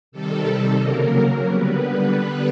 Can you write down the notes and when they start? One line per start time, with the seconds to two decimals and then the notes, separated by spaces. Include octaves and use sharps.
0.12 C3 D#3 G3 A4
0.80 C#3 F#3 A#3 A#4
1.48 D3 G3 B3 B4
1.82 B4